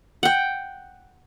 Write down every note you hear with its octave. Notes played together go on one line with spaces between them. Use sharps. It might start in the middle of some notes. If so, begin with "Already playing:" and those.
F#5 G5